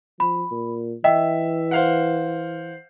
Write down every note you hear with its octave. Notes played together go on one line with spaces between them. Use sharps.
F3 B5
A#2
E3 D#5 E5 G5
C5 F5 F#5